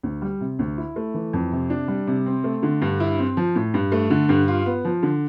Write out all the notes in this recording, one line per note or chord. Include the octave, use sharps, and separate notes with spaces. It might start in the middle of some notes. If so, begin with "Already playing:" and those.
D2
G3
C3
D2
E4
A3
E3
F2
C3
D4
G3
C3
C4
A3
D3
G2
E4
C4
F3
A2
G2
A3
D3
G2
F4
B3
F3
D3